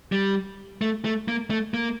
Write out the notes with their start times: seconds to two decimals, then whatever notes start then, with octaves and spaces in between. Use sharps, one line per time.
0.12 G3
0.81 A3
1.05 A3
1.28 A#3
1.50 A3
1.74 A#3